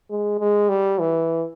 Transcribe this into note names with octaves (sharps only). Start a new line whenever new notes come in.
G#3
G#3
G3
E3